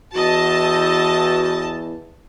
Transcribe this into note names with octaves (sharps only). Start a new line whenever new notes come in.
E2 E3 F#4 D#5 A5